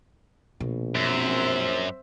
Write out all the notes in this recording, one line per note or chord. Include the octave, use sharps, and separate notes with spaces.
A#1 B2
F#2 C4 C5 E5